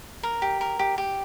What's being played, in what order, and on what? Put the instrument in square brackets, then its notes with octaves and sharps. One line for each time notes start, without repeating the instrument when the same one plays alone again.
[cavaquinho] A#4
G4
A#4
G4
G4